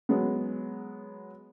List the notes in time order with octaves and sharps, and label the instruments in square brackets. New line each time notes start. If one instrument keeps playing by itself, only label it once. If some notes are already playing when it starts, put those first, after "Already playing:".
[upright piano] F#3 G#3 B3